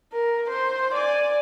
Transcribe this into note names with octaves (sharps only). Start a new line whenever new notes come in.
A#4
C5
D5 G#5